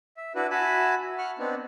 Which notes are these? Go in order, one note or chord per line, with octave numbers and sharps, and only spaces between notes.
E5
D4 E4 F#4 B4
F#4 E5 G#5 A5 B5
F#5 C#6 F6 F#6
B3 C4 D4 D#4